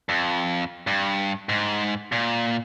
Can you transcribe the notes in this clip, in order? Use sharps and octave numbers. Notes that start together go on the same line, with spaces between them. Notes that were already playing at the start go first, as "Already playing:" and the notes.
F2
G2
G#2
A#2